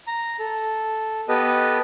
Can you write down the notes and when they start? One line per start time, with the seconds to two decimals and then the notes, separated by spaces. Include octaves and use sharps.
0.07 A#5
0.39 A4
1.29 B3 G4 A4 B4 D#5